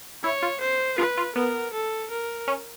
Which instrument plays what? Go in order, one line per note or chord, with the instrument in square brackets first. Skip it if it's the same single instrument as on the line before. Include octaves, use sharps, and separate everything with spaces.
[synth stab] E4 [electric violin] C#5
[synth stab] F4
[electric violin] C5
[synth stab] F4 [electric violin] B4
[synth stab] F4
[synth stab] B3 [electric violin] A#4
[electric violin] A4
A#4
[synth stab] C#4